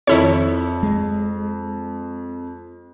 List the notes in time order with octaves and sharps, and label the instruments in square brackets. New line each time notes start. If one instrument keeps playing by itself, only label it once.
[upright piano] F2 [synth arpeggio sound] D#3 E4 C#5
[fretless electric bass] G#3